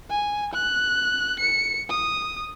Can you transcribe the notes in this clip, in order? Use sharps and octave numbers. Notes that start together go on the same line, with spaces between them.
G#5
F#6
C#7
D#6